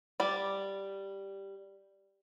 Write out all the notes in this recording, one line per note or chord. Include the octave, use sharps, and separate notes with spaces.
G3 D5